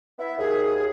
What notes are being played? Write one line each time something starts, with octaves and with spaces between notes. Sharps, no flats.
B3 E4 E5
D#2 G#4